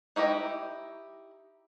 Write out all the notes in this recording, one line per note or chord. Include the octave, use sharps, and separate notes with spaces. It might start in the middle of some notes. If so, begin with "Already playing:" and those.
D#4 E4 G4 D#5